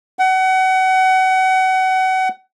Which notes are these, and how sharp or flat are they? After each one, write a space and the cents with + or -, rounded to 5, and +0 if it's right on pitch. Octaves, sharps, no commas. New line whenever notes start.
F#5 +30